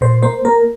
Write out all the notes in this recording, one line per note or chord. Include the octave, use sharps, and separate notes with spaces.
A#2 C5
A#3 C5
A#3 A#4